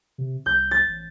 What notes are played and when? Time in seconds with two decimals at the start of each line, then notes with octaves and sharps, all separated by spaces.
0.18 C3
0.46 C2 G6
0.71 A6
0.88 A1